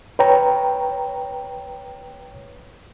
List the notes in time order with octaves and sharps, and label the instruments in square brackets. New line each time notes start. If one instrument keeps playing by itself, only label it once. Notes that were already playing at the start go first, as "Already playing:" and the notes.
[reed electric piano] B4 C#5 G5 A#5